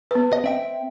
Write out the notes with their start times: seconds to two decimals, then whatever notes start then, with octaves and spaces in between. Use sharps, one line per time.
0.11 B3 B4
0.33 D#5
0.44 C4 E5 G5